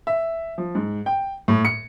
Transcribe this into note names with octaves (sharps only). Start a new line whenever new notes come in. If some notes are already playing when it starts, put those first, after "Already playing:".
E5
F3
G#2
G5
A2
C#7